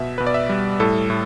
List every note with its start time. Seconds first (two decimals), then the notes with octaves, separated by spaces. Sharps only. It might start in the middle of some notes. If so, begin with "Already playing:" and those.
Already playing: B2 E5
0.18 B2 B4
0.27 D5
0.34 E5
0.49 G3
0.80 A2 A4
1.10 A2